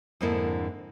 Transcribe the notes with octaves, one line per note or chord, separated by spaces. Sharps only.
F2 G#2 D3 A#3 E4